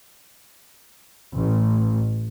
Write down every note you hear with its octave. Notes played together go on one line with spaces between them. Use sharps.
A1